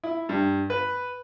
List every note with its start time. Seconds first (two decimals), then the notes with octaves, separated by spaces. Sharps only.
0.04 E4
0.29 G2
0.70 B4